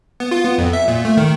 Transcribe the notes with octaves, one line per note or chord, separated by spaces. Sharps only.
B3
F4
B3
F2
E5
A#2
A3
D#3